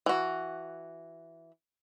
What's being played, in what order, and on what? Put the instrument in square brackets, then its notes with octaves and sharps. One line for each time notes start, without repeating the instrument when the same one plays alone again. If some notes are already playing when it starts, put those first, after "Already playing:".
[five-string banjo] E3 F#4